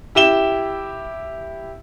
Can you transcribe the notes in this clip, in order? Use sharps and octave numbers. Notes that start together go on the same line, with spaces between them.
E4 G4 E7 G7